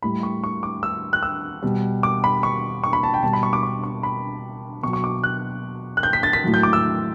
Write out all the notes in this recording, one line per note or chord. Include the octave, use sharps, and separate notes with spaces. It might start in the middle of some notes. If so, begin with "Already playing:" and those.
A2 G3 B5
C#6
C#6
D6
E6
F#6
E6
B2 G3
D6
B5
C#6
C#6
B5
A5
G5
B2 G3 A5
B5
C#6
D6
C#6
C#6
B5
B2 F#3 C#6
C#6
D6
F#6
F#6
G6
B6
A6
B6
A2 F#3
G6
D6
E6